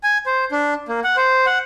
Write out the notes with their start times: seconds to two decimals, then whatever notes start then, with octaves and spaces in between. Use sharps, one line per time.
0.03 G#5
0.26 C5
0.52 D4
0.88 A#3
1.04 F#5
1.17 C5
1.46 F#5